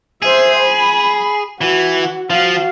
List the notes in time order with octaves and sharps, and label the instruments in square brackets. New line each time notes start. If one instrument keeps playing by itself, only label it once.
[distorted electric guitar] G#4 [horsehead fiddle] C5 E5
[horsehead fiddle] B5
[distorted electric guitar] E3 [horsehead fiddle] F#4
[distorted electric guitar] F3 [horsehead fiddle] F#4 F5